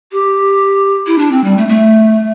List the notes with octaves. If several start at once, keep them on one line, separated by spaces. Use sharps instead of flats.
G4
E4
D4
C4
G3
A3
A3